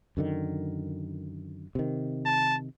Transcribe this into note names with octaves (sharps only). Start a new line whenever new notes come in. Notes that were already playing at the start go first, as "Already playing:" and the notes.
F#2 D3 D#3
C3 D#3
A5